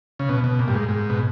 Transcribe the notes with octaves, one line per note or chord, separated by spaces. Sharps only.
C#3
B2
B2
A#2
G2
G#2
G#2
B2